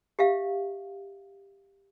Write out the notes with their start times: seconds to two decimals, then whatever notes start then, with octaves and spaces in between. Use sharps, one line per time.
0.19 G4 E5 F5